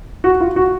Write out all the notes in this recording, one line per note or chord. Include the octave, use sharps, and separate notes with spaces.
F#4
F4
F#4